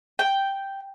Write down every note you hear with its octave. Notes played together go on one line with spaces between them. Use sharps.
G5